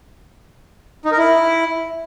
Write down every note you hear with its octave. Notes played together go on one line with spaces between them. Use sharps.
D#4
A#4
E4